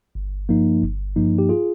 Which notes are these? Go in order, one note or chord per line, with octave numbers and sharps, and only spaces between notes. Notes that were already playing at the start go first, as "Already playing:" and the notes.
G1
G2 F3 A#3 D#4
G1
G2 F3 A#3 D#4
G4
F4 G#4